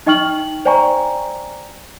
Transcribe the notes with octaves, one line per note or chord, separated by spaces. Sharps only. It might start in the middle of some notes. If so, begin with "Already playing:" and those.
D#4 D#5 G5 C#6 F6 F#7
C5 D5 G5 G#5 A#5 C#6